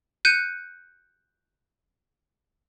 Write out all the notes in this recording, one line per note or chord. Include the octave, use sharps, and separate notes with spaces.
F#6 G6 C#7 D#7